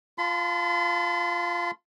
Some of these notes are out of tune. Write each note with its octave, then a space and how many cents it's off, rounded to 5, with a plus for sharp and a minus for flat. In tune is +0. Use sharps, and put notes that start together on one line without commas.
F4 +0 A5 +0 C6 -45